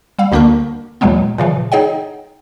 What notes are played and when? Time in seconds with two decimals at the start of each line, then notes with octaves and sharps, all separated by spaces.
0.19 G3 F5 E6
0.32 D2 D3 A#3 D4 A#4 C#6
1.01 D#2 A#2 E3 F#3 G#3 B3
1.38 A#2 C#3 E3 F3
1.72 D#4 G#4 C#5 D#5 F#5 G5